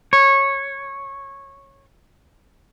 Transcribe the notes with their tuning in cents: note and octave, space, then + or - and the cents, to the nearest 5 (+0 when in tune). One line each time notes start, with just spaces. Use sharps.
C#5 -15